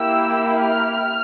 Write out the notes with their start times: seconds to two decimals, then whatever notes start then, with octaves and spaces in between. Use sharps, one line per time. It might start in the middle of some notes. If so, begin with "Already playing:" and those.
Already playing: A#3 E4 G4 E6
0.61 F6